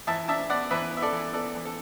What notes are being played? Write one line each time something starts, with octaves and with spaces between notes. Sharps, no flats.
E3 E5 A5
D4 E5 A5
B3 D5 F#5
E3 B4 E5
B3
E5
A4 D5
E3
B3 A4 D5
E3
A4